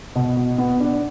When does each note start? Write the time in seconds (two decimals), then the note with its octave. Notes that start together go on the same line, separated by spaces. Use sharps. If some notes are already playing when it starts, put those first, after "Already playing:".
0.16 B2
0.37 B2
0.58 B3
0.80 D4